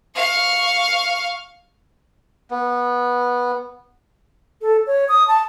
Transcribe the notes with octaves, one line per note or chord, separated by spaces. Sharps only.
F5 C#6
B3
A4
C#5
D#6
A5